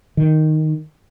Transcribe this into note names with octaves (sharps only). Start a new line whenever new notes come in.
D#3